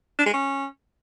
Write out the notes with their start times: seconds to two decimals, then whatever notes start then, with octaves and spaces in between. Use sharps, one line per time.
0.19 D4
0.26 G#3
0.33 C#4